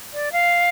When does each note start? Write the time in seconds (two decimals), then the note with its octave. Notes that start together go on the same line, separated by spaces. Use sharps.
0.14 D5
0.32 F5